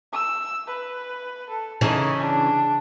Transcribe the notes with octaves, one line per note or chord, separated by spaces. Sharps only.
E6
B4
A4
C#3 E3 D#4 A4
D4